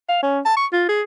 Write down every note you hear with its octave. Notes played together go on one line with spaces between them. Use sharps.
F5
C#4
A5
C#6
F4
G#4